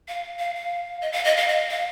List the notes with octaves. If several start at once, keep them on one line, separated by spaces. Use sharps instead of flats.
F5
F5
F5
D#5
F5
D#5
F5
D#5
F5